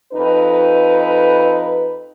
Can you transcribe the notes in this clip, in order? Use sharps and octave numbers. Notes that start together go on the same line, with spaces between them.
F2 D#4 B4